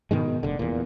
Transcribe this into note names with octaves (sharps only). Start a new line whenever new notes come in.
G#2 B2 D#3 G#3
F1 D3
E2 A#2